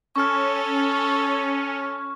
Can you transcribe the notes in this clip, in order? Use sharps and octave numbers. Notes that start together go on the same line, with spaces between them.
C#4 A4 C#6 F6